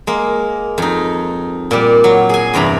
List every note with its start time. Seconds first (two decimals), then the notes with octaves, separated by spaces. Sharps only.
0.07 G#3 A#3
0.78 F2 D#4
1.71 A#2 G3
2.04 F#3
2.29 G#4 G#5
2.54 E2 G2 C3 A#5 B5